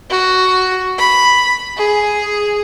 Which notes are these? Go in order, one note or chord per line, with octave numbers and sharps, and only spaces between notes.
F#4
B5
G#4